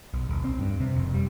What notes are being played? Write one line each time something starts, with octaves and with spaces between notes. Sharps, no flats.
B1
D#1
C4
G2
C3
F1
G3